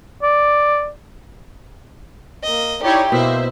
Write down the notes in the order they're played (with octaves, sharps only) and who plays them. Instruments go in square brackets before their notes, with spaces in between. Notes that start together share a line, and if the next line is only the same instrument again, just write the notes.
[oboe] D5
[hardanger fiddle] A#3 D#5
[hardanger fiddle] D#4 G4 [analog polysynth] E4 C#5 D5
[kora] B2 [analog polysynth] A#3 C5 E5 [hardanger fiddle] E4